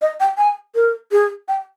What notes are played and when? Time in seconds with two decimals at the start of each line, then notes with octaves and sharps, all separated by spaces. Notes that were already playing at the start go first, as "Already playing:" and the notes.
0.02 D#5
0.20 G5
0.38 G#5
0.75 A#4
1.12 G#4
1.48 G5